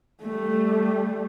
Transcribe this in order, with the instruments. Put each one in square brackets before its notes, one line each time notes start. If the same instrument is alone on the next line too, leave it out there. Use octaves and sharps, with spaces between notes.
[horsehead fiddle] G3 A3